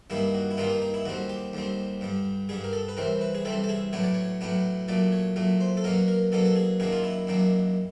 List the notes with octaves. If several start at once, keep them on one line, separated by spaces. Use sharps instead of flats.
G2 D#3 G3 A#3 D4 E4
F#4
E4
G2 D#3 G3 A#3 D4 F4
D#4
D#4
E4
D#2 D3 G3 C4 F#4
G4
D#2 D3 G3 C4
G2 D3 G3
G2 D3 G3 G#4
A#4
A4
B4
C2 C3 E3 G3 C4 A#4
B4
G#4
C2 C3 E3 G3 C4 A4
A4
G#4
A2 F#3 B3 D4 C#5
D5
C#5
A2 F#3 B3 D4
A#2 F#3 A3 D5
C#5
A#2 F#3 A3
C5
A4
B2 F#3 A#3 C#4 A#4
A#4
B2 F#3 A#3 C#4 A4
A4
G#4
F#2 D#3 F#3 A#3 D4 G#4
F4
E4
F#2 D#3 F#3 A#3 D4